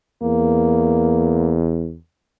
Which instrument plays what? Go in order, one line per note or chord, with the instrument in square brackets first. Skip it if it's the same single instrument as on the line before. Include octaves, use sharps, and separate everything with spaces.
[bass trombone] E2 [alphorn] A#3